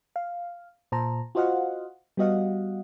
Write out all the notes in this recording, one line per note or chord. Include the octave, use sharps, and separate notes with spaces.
F5
A#2 C5 A5 A#5
F4 F#4 C5 D#5 F5 F#5
G3 B3 F#4 D#5 F5 F#5